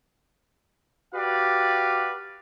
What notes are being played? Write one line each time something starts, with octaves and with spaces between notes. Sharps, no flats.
F#4 G4 B4 D5 F5